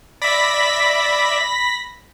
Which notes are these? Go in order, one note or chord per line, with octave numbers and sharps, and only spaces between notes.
D5 E5 B5 A#6 B6